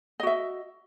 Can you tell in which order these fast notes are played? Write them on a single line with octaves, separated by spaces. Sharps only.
D#5 F#4 E5